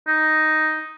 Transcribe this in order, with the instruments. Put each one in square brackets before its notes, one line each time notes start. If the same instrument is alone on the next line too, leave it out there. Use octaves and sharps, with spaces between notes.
[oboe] D#4